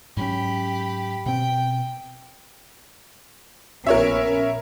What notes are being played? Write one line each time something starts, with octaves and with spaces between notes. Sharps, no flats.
G#2 F#3 C#4 G4 B5
B2 C4 G5
A#1 B3 C#4 A#4 C#5 E5